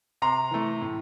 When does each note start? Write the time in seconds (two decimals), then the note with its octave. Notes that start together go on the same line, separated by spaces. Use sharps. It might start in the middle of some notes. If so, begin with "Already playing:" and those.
0.22 C3 A#5 C6
0.51 E3 A3
0.81 A2